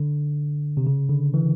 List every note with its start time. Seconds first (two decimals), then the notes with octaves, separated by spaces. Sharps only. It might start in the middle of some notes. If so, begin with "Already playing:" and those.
Already playing: D3
0.77 C3
0.87 C#3
1.09 D3
1.34 E3